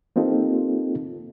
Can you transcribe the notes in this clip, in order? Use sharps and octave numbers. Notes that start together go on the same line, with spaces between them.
A#3 C4 D#4 F4 G4 A4